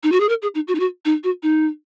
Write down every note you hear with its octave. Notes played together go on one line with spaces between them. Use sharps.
D#4
F#4
G#4
A#4
G#4
D#4
F#4
D#4
F#4
D#4
F#4
D#4